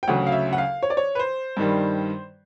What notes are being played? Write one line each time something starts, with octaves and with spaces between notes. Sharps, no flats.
G5
D2 C#3 F#3 F#5
F5
E5
F#5
F5
C#5
D5
C#5
B4
C5
G2 D#3 G3